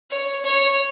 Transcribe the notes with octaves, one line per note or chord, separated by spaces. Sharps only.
C#5
C#5